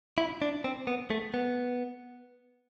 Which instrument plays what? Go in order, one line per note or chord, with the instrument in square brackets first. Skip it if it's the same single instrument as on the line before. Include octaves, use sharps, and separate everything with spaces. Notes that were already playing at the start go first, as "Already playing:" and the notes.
[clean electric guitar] E4
D4
C4
B3
A3
B3